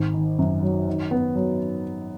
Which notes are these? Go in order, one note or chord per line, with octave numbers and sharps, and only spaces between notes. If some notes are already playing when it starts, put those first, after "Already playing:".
Already playing: G#1
D#3
F#2
F#3
D#3
B3
F#3